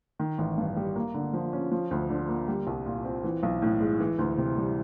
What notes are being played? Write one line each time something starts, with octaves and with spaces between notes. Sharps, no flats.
D#3
A1
G2
G3
A#3
D3
F3
C#4
F3
D2
D3
A#3
G3
C2
A#2
C4
E3
B1
A2
G#3
E3
D2
C3
G3